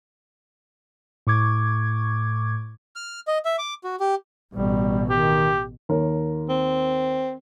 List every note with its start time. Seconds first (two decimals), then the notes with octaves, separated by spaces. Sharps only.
1.27 A2 C#6 D6 G#6
2.96 F6
3.27 D#5
3.45 E5
3.58 D6
3.84 F#4
4.00 G4
4.54 A1 B2 G3
5.10 D#3 G4
5.89 D#2 A#4 C#5
6.49 C4